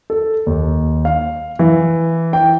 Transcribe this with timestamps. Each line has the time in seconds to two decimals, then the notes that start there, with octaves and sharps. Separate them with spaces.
0.10 A4
0.47 D#2
1.05 F5
1.59 E3
2.33 G5